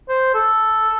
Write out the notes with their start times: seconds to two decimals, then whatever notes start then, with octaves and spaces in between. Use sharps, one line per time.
0.09 C5
0.34 A4